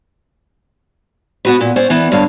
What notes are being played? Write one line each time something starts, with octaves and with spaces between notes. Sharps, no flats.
B3 F#4 B4
A#2
C#4 C5 D5
E3 B3
G2 D3 C#5 F5